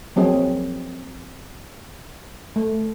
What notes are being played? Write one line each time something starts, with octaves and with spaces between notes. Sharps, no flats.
F3 F#3 A#3 C4 G#4
A3